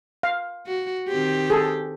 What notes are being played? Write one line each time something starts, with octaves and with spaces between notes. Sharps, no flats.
F5
F#4
D#3 C4 G4
G#4 A4